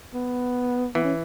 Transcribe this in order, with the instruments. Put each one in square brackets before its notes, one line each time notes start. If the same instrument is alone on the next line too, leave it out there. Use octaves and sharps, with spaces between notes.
[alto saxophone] B3
[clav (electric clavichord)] E3 [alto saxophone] B3
[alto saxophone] C#4